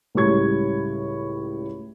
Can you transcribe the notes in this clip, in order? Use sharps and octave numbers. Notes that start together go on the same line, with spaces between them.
C#2 A2 G3 C#5 C#6 G#6